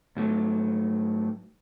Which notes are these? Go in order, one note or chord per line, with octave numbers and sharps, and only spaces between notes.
G#2 F#3 A3